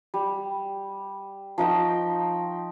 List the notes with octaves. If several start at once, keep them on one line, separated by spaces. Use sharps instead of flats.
G3
F3 D#4 G5 C#6